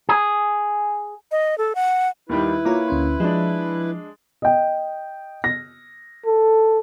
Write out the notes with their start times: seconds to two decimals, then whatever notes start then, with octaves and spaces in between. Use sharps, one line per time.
0.09 G#4
1.32 D#5
1.58 A4
1.75 F#5
2.29 D#2 D#3 G3 E4 B4
2.65 A#3 F4 C#5 A#5 D6
2.88 D2 C#4 C6
3.20 F3 G#3 D4
4.42 D#5 G5
5.44 A#6
6.26 A4